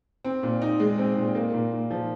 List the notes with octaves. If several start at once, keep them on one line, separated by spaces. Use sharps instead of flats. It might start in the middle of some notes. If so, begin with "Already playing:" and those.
C4
A#2
D#4
G#3
C4
A#2
A#3
A#2
A#2
F3